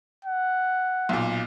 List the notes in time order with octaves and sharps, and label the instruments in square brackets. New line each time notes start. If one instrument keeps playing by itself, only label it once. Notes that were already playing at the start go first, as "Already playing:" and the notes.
[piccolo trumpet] F#5
[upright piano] B1 A#2